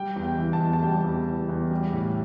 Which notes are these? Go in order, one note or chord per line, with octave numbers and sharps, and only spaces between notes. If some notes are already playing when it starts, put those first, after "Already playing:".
Already playing: G3 G5
E2
G5
E3
A5
E2
A5
G3 G5
E2
E3
E2
G3
A2